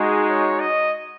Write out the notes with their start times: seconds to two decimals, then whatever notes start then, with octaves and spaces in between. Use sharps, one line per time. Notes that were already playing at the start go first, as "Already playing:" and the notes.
Already playing: G#3 D#4 F#4 G#4
0.29 C#5
0.59 D#5